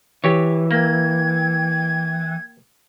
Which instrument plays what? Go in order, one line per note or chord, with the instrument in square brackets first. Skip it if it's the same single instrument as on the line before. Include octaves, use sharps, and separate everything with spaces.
[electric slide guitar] E3 [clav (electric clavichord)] G4 C#5
[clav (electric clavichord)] A#3 [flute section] G5 G#6